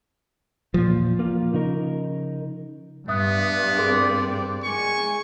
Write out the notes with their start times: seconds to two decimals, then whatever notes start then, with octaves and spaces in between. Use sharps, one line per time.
0.74 E2 A#2 F3
1.19 A#3 F4
1.53 C#3 D#4 A#4
3.08 G2 B3 E5 D#6 F#6
3.78 C4 G#4 A#4 D5 C6
4.64 G#3 G#5 C#6